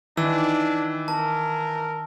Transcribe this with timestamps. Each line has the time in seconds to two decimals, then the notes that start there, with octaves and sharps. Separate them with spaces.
0.17 D#3 E3 D4 E6
1.08 A#4 A5